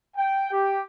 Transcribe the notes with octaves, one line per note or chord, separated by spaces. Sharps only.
G5
G4